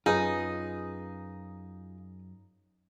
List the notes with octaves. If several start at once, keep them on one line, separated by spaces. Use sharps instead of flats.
F#2 D#4 F4 G#4 B4